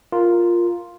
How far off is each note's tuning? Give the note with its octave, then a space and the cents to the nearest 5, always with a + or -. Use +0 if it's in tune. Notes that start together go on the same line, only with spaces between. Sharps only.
F4 +0 A#4 +0